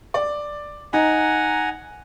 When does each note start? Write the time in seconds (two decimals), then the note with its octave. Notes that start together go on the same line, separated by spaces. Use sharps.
0.14 D5
0.93 D#4 F#5 G#5 A#5